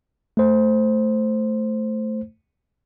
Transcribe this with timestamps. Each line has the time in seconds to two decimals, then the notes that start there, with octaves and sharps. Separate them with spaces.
0.37 A3 C5